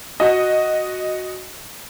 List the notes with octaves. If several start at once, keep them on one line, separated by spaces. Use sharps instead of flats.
F#4 D#5